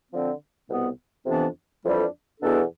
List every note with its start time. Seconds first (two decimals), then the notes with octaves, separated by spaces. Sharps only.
0.10 D3 F3 C4
0.68 C2 B2 B3
1.25 F2 C3 E3 B3 D4
1.83 F2 E3 G3 D4 A4
2.40 E2 B2 B3 D4 A4